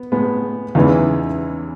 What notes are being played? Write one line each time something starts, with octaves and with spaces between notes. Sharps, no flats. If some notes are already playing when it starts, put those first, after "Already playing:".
Already playing: B3
A2 G#3 B3
E2 C#3 E3 G#3 B3 D#4